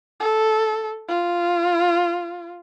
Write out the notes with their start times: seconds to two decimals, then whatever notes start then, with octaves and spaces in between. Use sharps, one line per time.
0.20 A4
1.08 F4